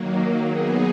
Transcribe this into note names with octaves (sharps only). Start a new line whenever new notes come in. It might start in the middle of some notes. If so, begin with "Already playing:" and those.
Already playing: D#3 F#3 A#3
F#3 B3 D#4 G#4